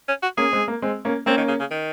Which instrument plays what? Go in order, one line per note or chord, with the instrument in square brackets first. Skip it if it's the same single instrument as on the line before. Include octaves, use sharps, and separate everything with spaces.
[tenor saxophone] C#4
F#4
[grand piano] A#3 C#4 [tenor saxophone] G#4
[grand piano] G#3 C4
A#3
G#3 C4
A#3 C#4
[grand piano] A#3 C#4 [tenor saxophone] C4
[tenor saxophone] D#3
C#3
C#3
D#3